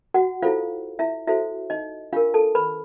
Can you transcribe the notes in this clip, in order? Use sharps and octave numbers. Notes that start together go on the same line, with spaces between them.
F#4 F#5
E4 F4 A4 C5 F5
E4 E5
E4 F#4 A4 C5 E5
D#4 D#5
D4 F4 G4 A#4 F5
A4 A5
B4 B5